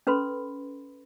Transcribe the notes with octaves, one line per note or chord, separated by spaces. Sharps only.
C#4 A4 B4 B5 C6